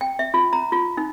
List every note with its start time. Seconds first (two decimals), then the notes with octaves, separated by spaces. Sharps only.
0.01 G5
0.19 E5
0.34 F4
0.53 A#5
0.72 F4
0.97 D#4